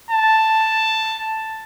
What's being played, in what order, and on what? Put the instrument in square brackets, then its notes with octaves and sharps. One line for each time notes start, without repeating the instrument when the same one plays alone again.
[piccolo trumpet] A5